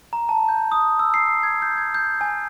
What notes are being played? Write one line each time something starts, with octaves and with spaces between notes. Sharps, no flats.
A#5
A5
G6
D#6
E6
C7
G#6
G6
G#6
G6
G#5